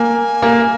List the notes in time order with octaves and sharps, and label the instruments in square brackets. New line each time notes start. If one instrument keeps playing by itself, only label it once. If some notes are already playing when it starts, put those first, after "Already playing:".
Already playing: [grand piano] A#3 [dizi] G#5
[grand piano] A#3